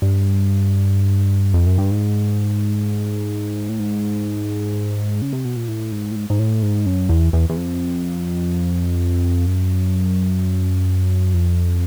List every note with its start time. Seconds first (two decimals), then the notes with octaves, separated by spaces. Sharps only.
0.02 G2
1.54 F2
1.67 F#2
1.78 G2
1.91 G#2
3.69 A2
3.79 G#2
5.22 C#3
5.33 C3
5.45 B2
5.57 A#2
5.68 A2
5.92 G#2
6.12 A2
6.16 G#2
6.30 G#2
6.39 A2
6.62 G#2
6.86 F#2
7.09 E2
7.33 E2
7.50 E2
7.57 F2
9.46 F#2
11.34 F2